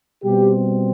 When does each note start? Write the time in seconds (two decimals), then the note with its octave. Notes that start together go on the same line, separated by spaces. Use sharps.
0.24 B2 G3 C4 G4